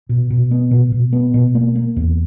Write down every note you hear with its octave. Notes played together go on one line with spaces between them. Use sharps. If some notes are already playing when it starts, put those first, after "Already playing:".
B2
B2
B3
B2
B2
B3
B2
A#3
A#3
E2